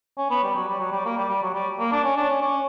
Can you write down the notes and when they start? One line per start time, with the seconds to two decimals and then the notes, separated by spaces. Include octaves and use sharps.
0.18 C#4
0.31 B3
0.43 G3
0.56 F#3
0.68 G3
0.80 F#3
0.93 G3
1.05 A#3
1.17 G3
1.29 G3
1.43 F#3
1.54 G3
1.80 A#3
1.92 D4
2.04 C#4
2.17 D4
2.29 C#4
2.42 C#4